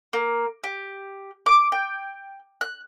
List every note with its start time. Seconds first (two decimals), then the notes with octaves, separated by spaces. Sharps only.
0.13 A#3
0.64 G4
1.46 D6
1.72 G5
2.61 F#6